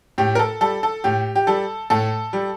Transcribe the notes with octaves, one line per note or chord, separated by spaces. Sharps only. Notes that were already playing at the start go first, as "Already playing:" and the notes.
A2 G4
A#4
A4
G3 A4
A4
A2 G4
G4
G3 A4
A2 A4
G3